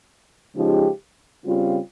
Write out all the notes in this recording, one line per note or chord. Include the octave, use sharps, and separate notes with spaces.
C#3 F3 G#3 D#4 G4
C#3 G3 C4 F4